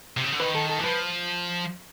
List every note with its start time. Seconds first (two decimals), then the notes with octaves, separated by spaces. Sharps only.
0.17 C3
0.24 C#3
0.33 D3
0.40 D#3 B4
0.55 A4
0.69 A4
0.79 E3
0.84 F3 B4